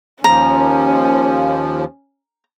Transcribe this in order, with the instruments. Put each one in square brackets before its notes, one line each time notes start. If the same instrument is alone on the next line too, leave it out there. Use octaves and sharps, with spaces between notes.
[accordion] D#2 F3 [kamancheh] C#4 [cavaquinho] A#5